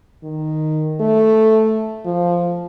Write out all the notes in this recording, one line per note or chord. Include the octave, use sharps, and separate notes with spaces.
D#3
A3
F3